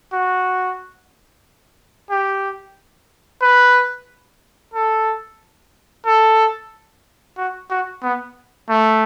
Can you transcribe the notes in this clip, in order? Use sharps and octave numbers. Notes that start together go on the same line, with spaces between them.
F#4
G4
B4
A4
A4
F#4
F#4
B3
A3